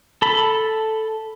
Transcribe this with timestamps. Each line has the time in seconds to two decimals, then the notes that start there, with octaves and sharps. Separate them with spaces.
0.22 A4 B5